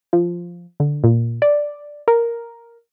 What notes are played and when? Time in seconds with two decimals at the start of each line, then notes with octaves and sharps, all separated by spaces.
0.13 F3
0.80 D3
1.04 A#2
1.42 D5
2.08 A#4